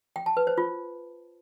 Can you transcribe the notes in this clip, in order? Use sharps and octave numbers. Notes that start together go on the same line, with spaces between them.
G5
A5
B4
C5
F4